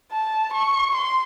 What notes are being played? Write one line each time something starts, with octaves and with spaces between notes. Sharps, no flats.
A5
C#6
C6